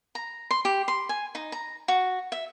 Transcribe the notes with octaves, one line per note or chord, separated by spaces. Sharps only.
A#5
C6
G4
C6
G#5
D#4
A#5
F#4
E5